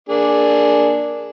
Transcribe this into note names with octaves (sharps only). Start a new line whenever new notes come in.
A#3 D4 G#4